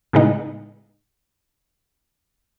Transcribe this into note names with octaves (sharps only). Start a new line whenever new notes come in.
A2 C#3 G#3 B3 D#4